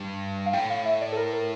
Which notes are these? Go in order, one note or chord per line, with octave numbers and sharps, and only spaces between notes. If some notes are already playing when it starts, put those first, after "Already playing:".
Already playing: G2
F5
A2 G5
F5
E5
D5
A4
A#4
A#4